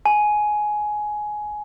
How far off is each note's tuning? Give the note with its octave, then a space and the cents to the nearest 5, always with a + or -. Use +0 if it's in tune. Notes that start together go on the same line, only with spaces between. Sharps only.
G#5 +15